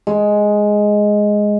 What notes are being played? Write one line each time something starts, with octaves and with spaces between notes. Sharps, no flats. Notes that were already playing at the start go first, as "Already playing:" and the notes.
G#3